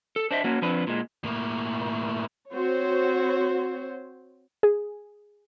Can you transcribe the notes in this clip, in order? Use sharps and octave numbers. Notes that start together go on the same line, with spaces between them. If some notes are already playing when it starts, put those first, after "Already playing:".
A4
D4 C5 D#5 E5
A#3 C#4 F#4
F3 C4 D4 B4
A#2 G#3
A2 A#3
C4 F#4 C5 C#5
G#4